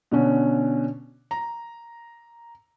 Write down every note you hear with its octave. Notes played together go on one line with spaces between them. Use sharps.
B2 D3 C#4
A#5